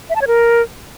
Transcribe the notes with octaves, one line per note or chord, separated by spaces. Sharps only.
E5
A5
C#5
A#4